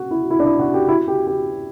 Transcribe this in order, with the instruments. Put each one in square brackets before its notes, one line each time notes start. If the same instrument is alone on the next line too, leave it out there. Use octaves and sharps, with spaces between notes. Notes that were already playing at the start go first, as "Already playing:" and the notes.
Already playing: [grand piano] F#4
E4
E4
D4
E4
F#4
G4
E4
G4
G4